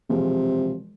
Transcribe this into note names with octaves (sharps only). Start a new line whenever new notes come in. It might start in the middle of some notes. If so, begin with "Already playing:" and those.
E1 C3 F3 G#4